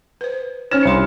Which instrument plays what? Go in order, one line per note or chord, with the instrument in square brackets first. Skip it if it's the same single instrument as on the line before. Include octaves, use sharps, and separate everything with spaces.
[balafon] B4 C5
[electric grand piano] C#4 F6 E7 [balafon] D#4 C5 C#5
[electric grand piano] C2 C#7 [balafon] D4 C6